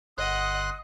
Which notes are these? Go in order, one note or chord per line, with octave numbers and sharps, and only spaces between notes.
G1 D#5 F#5 C6 D#6 F#6